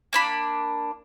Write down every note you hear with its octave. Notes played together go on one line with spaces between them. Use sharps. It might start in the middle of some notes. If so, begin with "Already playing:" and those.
A#3 D4 B5